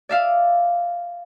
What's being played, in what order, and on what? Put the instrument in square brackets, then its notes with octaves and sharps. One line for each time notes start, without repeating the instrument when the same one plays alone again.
[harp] D5 E5 F5